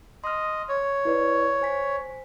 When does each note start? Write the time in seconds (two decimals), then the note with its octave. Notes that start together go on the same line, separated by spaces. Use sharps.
0.24 D#5 C6 F6
0.69 C#5
1.05 E4 B4 D5
1.61 C5 G#5 B6